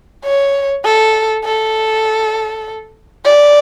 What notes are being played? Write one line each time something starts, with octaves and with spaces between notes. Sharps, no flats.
C#5
A4
A4
D5